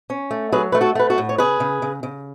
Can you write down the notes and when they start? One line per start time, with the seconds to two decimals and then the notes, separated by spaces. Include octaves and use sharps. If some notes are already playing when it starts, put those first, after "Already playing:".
0.10 C#4
0.31 A3
0.52 F#3 G#4 B4
0.72 A3 B4
0.81 F#4 A4
0.95 A3 B4
1.10 F#4 A4
1.18 A2
1.29 C#5
1.38 C#3 G#4 B4
1.60 C#3
1.82 C#3
2.03 C#3